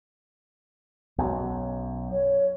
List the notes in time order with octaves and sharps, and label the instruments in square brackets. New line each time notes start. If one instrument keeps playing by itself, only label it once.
[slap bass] B1 F#2
[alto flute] C#5